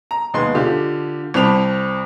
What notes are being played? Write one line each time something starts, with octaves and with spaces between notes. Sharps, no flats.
A#5
D#2 G#3 B3 C6
D3 F4 G4
C2 C4 A5 B5 F7